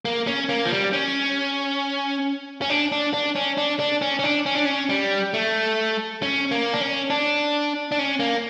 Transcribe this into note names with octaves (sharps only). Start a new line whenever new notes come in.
A#3
C#4
A#3
F3
G3
C#4
C#4
D4
D4
D4
C#4
D4
D4
C#4
C#4
D4
C#4
D4
C#4
G3
A3
C#4
A#3
D4
C#4
D4
D4
C#4
A#3